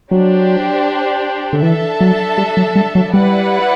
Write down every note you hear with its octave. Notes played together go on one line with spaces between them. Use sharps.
F#3 D4 G4 C5
D3
E3 D4 A4 E5 A5
F#3
G3
F#3
G3
F#3
G3 E4 B4 D5 F#5